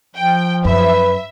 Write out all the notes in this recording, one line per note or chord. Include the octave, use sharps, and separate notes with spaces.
F3 G5
F#2 B4 E5